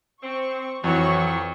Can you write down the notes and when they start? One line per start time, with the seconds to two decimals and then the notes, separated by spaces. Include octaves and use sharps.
0.23 C4 C#6
0.84 F2 E3 F#3 C#6